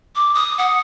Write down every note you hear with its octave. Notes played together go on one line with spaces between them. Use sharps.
D6
D#6
F#5